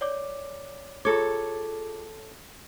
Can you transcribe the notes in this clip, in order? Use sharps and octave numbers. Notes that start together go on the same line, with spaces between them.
C#5 D5 D6
F4 G#4 A4 C#5 D6